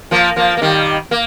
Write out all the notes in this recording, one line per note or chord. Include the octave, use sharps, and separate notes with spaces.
F3 A#3
F3 A#3
A#3
D#3 G3
A#3